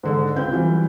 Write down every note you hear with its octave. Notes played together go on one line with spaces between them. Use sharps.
G#2 D3
C#2 C4 B4 G6
E3 F#3 G3